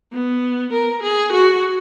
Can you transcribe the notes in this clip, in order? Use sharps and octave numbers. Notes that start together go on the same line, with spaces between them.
B3
A#4
G#4
F#4